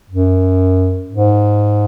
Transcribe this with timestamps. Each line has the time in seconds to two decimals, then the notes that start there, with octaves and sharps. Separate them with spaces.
0.10 F#2
1.10 G#2